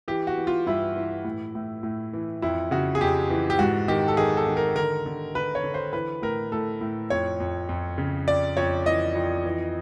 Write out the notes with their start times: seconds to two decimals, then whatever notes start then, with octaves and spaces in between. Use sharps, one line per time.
0.08 E3 G4
0.27 F#4
0.37 E3
0.47 F4
0.66 G2 E4
0.96 E3
1.24 A2
1.55 A2
1.83 A2
2.13 E3
2.42 F2 E4
2.71 C#3 F#4
2.95 G#4
3.01 F2 G4
3.30 E3
3.50 G4
3.59 G#2 F#4
3.88 D#3 G4
4.08 A4
4.17 D#3 G#4
4.37 A4
4.47 D#3
4.57 A#4
4.76 D3 A#4
5.06 D3
5.35 D3 B4
5.55 C#5
5.64 D3
5.74 C5
5.93 E3 B4
6.22 A2 A#4
6.52 A2 A4
6.81 A2
7.10 F2 C#5
7.40 F2
7.69 F2
7.98 C#3
8.27 F2 D5
8.57 F2 C#5
8.86 E3 D#5
9.15 F2
9.45 E3